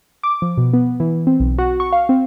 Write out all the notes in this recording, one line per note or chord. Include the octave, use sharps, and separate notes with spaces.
D6
F3
B2
B3
E3
C4
B1
F#4
C#6
F5
C4